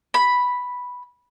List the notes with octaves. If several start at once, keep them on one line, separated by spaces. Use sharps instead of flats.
B5